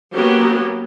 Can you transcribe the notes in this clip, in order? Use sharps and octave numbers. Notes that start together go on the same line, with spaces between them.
F#3 A#3 B3 C#4 G4